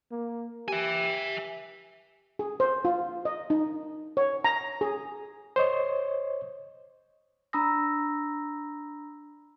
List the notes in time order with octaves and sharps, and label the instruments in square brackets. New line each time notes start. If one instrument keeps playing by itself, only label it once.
[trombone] A#3
[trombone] G4 [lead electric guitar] E5 G#5
[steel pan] G#4
C5
F4
D#5
D#4
C#5
A#5
G#4
[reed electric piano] C5 C#5 D#5
[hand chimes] D4 A#5 B5 D#6 E6 A#6